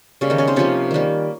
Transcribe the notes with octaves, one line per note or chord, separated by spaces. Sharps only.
C#3 G3 A#3 C#4
D#3 D#4
C#4 C#5
C4 C5
C3 F3 A#3 C#4 C#5
D#3 G3 A#3